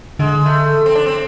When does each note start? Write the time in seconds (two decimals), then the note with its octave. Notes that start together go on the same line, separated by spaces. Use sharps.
0.19 D3 G#3
0.46 A3
0.86 C4
0.95 D4
1.06 C4